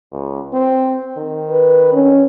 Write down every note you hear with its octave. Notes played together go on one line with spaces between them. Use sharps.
C#2
C4
D#3
B4
C#4